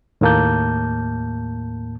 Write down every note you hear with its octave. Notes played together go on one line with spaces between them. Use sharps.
D#2 A2 A#3 A5 G6